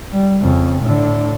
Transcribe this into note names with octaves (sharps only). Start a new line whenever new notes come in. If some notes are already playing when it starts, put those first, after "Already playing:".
G3
F2 C#3
A2 D3